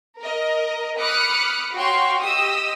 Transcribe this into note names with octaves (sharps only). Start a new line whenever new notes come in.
A#4 D#5
B5 D6 D#6 F6 F#6 C#7
F#4 C#5 F5 G5 C6 C#6
G4 D#5 D#6 E6